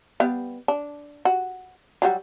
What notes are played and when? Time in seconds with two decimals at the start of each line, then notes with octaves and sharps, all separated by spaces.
0.20 G3 B3 F5
0.68 D4
1.25 F#4
2.02 F#3 G3 F#4